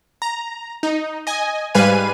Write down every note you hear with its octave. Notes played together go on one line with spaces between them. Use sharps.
A#5
D#4
D#5 G#5
G#2 G3 B4 F5 G#5 D#7